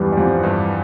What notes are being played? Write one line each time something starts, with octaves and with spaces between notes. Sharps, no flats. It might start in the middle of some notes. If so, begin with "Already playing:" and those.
Already playing: E2 G2 E3 G3
G3
F2 F3
G2 G3